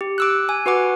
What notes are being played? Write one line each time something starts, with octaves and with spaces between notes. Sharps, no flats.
G4
D6 E6 F#6
G#5
F#4 B4 F#5 D6